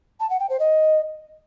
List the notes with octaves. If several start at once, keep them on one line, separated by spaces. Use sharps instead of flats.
A5
F#5
G5
C5
D#5